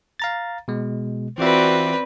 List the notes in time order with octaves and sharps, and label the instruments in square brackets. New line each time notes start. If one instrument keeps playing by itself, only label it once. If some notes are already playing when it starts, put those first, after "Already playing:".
[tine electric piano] F5 A#5 A6
B2 G#3
[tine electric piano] E3 F4 E5 [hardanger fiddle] C4 B4 [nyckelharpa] F#4 D5